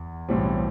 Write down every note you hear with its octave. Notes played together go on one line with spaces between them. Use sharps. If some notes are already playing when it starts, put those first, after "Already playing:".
Already playing: E2
B1 A2 E3 G3 C4